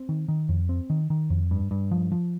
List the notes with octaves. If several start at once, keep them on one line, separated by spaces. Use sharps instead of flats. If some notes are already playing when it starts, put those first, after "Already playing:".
Already playing: C4
D#3
D#3
F2
C4
D#3
D#3
F2
G2
G2
F3
F3